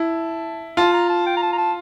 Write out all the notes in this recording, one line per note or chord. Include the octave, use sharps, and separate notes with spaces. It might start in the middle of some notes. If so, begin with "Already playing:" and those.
Already playing: E4 A5
F4 A5
A#5
A5
G5
A#5
A5
A#5
A5